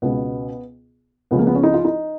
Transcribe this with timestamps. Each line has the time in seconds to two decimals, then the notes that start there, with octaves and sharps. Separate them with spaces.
0.02 C#2 B2 B3
1.31 C#2 C#3 F3 B3
1.39 A#3
1.47 B3
1.55 C#4
1.63 D#4
1.74 F4
1.85 D#4